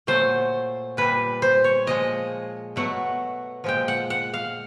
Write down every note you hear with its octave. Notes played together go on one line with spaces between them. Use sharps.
A#2 F#3 A3 C5
A#2 G3 B4
C5
C#5
A#2 F3 G#3 D#5
B2 F#3 A3 F#5
A#2 F3 G#3 G5
F#5
F#5
F5